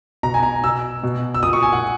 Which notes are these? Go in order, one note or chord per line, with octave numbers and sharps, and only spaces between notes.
B2 A#5
G#5
A#5
B2 E6
B2
E6
A#2 D#6
C#6
G#5
F#5